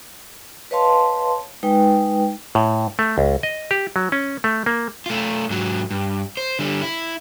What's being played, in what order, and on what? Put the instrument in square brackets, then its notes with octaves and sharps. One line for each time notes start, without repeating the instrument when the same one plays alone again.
[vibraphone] B4 C#5 D#5 F5 A5 C6
G#3 D#4 B4 G5
[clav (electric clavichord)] A2
A3
C#2
D#5
G4
F#3
C#4
A3
A#3
[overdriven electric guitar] A3 F4
G#2 F#3
G2
C5
D3 G3
E4